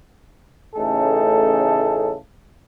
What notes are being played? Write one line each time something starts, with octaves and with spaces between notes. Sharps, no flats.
A1 C#3 A3 D#4 G#4 A4